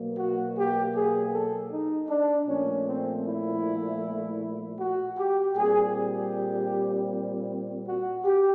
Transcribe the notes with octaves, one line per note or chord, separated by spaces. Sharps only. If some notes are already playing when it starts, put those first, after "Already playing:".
Already playing: B2 F#3 A#3
F#4
G4
G#4
A4
D#4
D4
A#2 F3 A3 C#4
C4
E4
F#4
G4
A#2 G3 C4 G#4
G4
F#4
G4